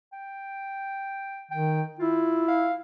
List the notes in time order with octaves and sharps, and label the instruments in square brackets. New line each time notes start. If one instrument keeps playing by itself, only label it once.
[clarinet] G5
[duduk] D#3 [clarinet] G5
[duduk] E4 [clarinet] F4
[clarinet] F5